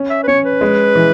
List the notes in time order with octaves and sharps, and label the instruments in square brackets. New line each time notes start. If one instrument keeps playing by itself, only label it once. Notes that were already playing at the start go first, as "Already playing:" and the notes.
Already playing: [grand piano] C#4
[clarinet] E5
B4
[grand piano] C#4 [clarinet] C#5
[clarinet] B4
[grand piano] G#3
E3